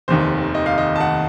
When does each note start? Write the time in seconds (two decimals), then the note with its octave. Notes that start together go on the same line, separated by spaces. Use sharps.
0.08 F1 D#2 D#3 C5
0.55 D#5
0.66 F5
0.78 D#5
0.96 A5
1.00 F#5